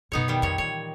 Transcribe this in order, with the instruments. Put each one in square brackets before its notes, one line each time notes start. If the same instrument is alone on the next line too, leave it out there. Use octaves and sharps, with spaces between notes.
[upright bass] F#2 B2 [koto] B3 D#4 C#5
[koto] D#3 G3
[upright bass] F2 [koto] A#2 C#5
[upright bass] E3 [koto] C#5